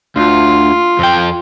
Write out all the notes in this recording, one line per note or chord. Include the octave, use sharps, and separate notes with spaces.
D2 F4
F2 G5